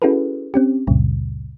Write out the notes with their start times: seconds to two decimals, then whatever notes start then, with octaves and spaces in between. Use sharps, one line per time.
0.02 C#4 E4 F#4 G#4 A4 B4
0.54 C4 C#4 G4
0.87 C#2 F#2 A#2 C#3 G3